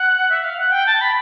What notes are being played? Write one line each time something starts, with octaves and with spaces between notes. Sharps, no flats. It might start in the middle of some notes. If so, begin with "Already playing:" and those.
Already playing: F#5
E5
F5
F#5
G5
A5
B5